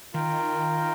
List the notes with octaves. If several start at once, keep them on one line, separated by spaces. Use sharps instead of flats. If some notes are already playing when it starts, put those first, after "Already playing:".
D#3 F4 A#4 G5